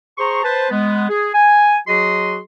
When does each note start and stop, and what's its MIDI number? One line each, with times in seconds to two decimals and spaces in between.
0.18 0.42 68
0.18 0.42 72
0.18 0.42 82
0.18 0.42 84
0.18 0.42 85
0.44 0.69 71
0.44 0.69 72
0.44 0.69 81
0.71 1.05 56
0.71 1.05 59
1.09 1.29 68
1.34 1.76 80
1.87 2.38 54
1.87 2.38 66
1.87 2.38 68
1.87 2.38 75
1.87 2.38 84